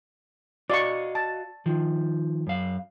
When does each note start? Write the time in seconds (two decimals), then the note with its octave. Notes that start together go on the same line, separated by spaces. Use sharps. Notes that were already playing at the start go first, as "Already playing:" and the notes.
0.70 F#4 D5 D#5 F5 C#6
1.15 A5
1.66 D#3 F3
2.47 F#2 F5